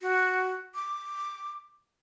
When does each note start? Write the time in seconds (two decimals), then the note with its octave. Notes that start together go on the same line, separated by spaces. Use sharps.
0.01 F#4
0.75 D6